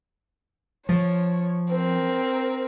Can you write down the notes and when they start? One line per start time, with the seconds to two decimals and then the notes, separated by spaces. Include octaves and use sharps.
0.89 F3 C#5
1.72 C4 A#4